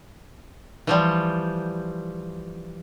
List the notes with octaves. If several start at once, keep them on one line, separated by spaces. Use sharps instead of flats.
E3 F3 G3